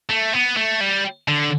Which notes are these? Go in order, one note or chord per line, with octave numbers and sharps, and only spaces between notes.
A3
B3
A3
G3
D3